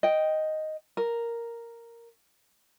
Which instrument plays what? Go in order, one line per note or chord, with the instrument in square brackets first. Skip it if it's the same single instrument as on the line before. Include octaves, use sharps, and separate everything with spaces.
[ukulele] D#5 G5
A#4